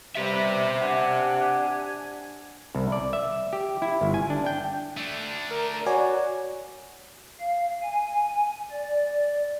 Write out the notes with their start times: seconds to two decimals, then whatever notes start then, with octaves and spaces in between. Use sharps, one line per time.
0.15 C3 G3 G4 B4 E5
0.80 D4 F#5 G#5
2.75 C2
2.92 D5
3.13 E5
3.53 G4
3.82 E4
4.01 G1
4.14 G#5
4.30 D4
4.46 G5
4.97 A3 D4
5.50 A#4
5.73 A#4
5.86 F#4 C#5 D5 G#5
7.40 F5
7.82 G#5
8.71 D5